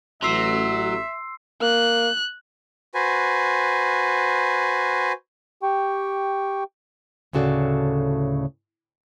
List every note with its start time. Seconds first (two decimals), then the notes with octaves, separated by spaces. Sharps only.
0.22 A1 F#3 E5 C6 E6 C7
1.62 A#3 F#6
2.94 F#4 B4 C5 G#5
5.63 G4 G5 C#6
7.33 D2 A2 C#3 F#4 A4 D5